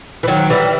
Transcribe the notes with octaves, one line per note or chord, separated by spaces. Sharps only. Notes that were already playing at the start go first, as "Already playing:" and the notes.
E3
D#3 F#3
E3 G3